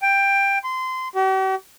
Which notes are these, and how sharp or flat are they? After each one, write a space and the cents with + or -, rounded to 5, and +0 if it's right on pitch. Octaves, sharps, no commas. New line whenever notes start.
G5 +15
C6 -20
G4 -45